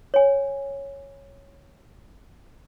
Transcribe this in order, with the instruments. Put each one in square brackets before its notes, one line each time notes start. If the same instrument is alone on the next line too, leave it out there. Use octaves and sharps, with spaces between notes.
[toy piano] C#5 G#5